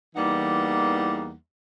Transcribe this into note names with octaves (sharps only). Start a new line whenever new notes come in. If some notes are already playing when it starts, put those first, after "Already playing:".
E2 E3 G3 A#3 D#4 F#5